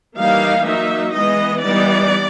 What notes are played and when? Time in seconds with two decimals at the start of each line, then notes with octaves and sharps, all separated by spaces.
0.18 E3 G3 A#3 D#4 F5
0.66 F#3 A#3 D#4 E5
1.14 E3 G#3 B3 D#5
1.62 E3 G3 B3 D#4 D5